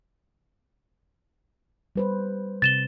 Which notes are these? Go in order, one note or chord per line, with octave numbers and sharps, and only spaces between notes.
G3 B4 C5
C3 A6 E7 G7